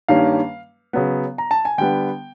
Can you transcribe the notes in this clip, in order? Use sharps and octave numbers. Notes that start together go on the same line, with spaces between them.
G2 D#3 G3 A#3 C#4 F5
C#3 F#3 B3
A#5
A5
G#5
D3 G3 B3 G5